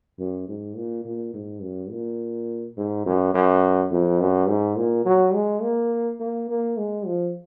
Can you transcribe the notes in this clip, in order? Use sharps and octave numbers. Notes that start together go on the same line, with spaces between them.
F#2
G#2
A#2
A#2
G#2
F#2
A#2
G#2
F#2
F#2
F2
F#2
G#2
A#2
F#3
G#3
A#3
A#3
A#3
G#3
F3